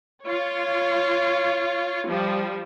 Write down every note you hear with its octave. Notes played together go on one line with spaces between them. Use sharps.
F4 C#5
F3 G3